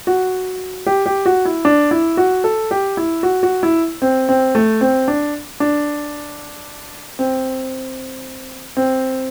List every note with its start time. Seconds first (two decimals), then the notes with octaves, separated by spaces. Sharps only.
0.07 F#4
0.86 G4
1.06 G4
1.26 F#4
1.45 E4
1.65 D4
1.91 E4
2.17 F#4
2.44 A4
2.71 G4
2.97 E4
3.23 F#4
3.43 F#4
3.63 E4
4.02 C4
4.29 C4
4.55 A3
4.81 C4
5.08 D4
5.60 D4
7.19 C4
8.77 C4